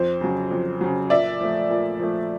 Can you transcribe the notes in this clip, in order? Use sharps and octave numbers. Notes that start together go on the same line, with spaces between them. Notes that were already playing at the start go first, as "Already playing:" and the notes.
Already playing: F2 C5
C#3 F#3
F2
C#3 F#3
A#2 D5 E5
F3 A3
A#2
F3 A3